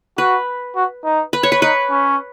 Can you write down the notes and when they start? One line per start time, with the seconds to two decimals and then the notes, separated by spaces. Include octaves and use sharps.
0.18 F#4 B4
0.76 F#4
1.04 D#4
1.33 B4
1.43 C#5
1.52 B4
1.62 D#4 B4
1.91 C#4